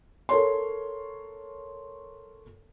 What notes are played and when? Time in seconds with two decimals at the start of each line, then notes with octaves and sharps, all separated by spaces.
0.29 A4 A#4 C#5 C6